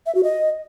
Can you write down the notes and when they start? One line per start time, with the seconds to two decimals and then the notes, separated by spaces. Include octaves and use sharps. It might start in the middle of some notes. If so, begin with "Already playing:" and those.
0.06 E5
0.15 F#4
0.23 D#5